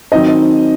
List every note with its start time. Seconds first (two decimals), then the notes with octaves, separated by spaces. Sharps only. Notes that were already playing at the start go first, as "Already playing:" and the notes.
0.12 D#3 F#3 C4 D#4 D#5